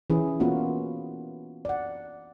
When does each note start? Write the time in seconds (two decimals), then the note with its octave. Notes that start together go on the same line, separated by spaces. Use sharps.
0.10 E3 C#4 E4 G#4
0.40 A#3 B3 C#4 F4 F#4
1.65 D5 F#5